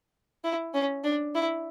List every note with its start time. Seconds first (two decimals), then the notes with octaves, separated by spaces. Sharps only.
0.44 E4
0.74 C#4
1.04 D4
1.35 E4